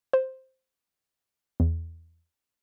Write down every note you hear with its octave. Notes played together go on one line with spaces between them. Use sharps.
C5
E2